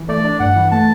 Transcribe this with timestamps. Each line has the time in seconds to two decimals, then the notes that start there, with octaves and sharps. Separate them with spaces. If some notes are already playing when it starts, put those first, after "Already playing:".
Already playing: E3
0.09 A3 D5
0.24 D4
0.40 G2 F#5
0.56 E3
0.71 A3 A5